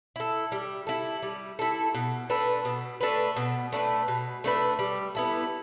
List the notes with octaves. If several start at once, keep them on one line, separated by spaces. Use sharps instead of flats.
E4 A4
G3
E4 A4
G3
E4 A4
B2
A3 D4 B4
B2
A3 D4 B4
B2
A3 D4 B4
B2
A3 D4 B4
G3
B3 E4 A4